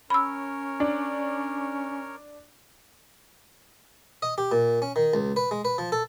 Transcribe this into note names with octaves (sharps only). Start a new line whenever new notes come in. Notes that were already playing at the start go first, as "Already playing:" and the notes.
C#4 A#4 C#5 B5 E6
D4
D#5
G4
A#2
C#4
D#3
C#2
B4
G#3
B4
F3
A4